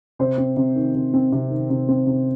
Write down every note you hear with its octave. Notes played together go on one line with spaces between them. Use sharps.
C3 C5
C4
C3
D#3
C3
C4
C3
D#3
C3
C4
C3